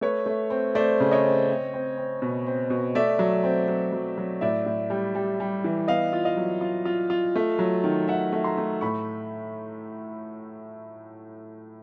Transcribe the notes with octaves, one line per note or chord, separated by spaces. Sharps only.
A3 B4 C#5
A3
C4
A3 C5 D5
C#3
C#5 D#5
C4
C4
C4
C4
B2
C4
B2
A3 D5 E5
F#3
C4
F#3
F#3
F#3
A2 D5 E5
A2
G3
G3
G3
E3
B3 D#5 F5
F4
D#5 F5
F#3
F4
F4
F4
A3
F#3
D#3
D#3 E5 F#5
A3
A#5 C6
A3
A2 B5 C#6